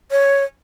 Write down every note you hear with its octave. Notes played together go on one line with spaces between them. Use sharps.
C#5